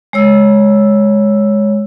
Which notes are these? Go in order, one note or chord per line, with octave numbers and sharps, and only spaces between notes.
G#3 C#5 E6